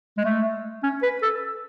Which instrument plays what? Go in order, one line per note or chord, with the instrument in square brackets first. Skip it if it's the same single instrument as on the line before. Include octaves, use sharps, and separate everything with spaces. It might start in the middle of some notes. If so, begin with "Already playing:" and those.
[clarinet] G#3
A3
C#4
B4
A4